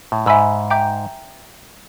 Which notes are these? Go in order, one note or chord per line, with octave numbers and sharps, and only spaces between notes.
A2
G#2 E5 G#5 B5 E6
E5 G5 A#5 D6 G6